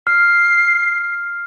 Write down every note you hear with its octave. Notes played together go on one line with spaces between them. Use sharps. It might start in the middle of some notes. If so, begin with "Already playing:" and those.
F6 C7